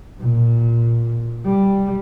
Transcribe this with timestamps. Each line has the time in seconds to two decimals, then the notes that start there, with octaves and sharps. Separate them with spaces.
0.20 A#2
1.45 G3